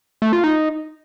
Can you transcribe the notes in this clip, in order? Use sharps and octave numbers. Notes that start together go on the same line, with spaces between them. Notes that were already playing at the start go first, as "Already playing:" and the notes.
A3
F4
D#4